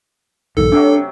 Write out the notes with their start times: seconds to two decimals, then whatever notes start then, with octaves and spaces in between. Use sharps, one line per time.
0.57 A#1 G2 D#3 A4
0.72 C3 F#3 D4